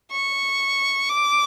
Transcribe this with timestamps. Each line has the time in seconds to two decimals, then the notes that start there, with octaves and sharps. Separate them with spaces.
0.12 C#6
1.09 D6